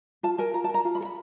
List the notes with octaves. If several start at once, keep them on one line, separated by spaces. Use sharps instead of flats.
F4 A5
A#4 G#5
F4 A#5
A5
A#4
A#5
F4
B5
A4
B5